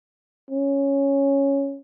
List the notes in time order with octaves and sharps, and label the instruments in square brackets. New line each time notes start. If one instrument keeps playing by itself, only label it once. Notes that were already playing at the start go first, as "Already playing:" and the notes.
[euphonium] C#4